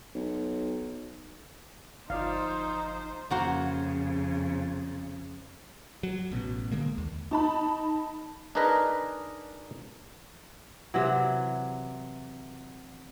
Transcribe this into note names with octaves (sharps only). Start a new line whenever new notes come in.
B1
G1 F3 D#4 F4 C5 D5 F5
F2 C#3 A#3 F#4 C5
F#3
A1 B2
D3 G#3 A#3
D#2
D#4 A5 B5
D4 D#4 G#4 A#4 B4 D#5
C3 E3 F#3